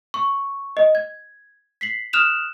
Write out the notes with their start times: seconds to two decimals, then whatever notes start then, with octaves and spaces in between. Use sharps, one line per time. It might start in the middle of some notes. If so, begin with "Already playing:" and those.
0.14 C#6
0.77 D#5
0.95 G#6
1.81 B6 C7 F#7
2.13 D#6 F6 F#6 E7 F7